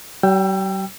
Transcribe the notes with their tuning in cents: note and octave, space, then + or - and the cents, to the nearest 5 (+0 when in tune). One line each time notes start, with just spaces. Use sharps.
G3 -45 G5 +5 E6 +30